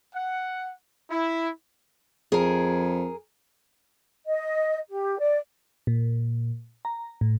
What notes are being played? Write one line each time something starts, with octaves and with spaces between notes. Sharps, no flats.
F#5
E4
F2 G#4 A#4
D#5
G4
D5
A#2
A#5
A2